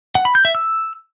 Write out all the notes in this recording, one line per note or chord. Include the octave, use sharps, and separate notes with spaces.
F#5
B5
G6
E5
E6